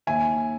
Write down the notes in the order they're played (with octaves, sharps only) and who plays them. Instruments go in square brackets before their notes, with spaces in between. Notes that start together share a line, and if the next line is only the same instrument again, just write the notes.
[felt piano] D#2 E5 G#5